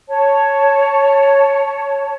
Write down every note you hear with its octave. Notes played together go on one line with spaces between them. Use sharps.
C#5 A5